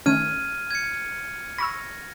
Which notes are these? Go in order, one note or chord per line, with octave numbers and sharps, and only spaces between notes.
D#3 A3 C#4 F6 G#6 D#7
G#6 C#7
B5 C#6 E6 A#6